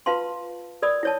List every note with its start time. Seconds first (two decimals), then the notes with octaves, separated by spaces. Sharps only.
0.06 F4 B4 F5 A5 C6
0.82 A#4 D5 B5 D#6
1.03 E4 C#5 A5